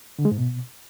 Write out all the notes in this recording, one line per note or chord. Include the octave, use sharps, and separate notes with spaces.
D3
G#3
G#2
B2